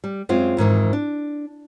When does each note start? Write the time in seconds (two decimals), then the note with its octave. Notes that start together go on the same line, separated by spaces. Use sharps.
0.04 G3
0.29 F#2 G#3 C4 F4
0.57 F2 G#2 D#3 E3
0.93 D4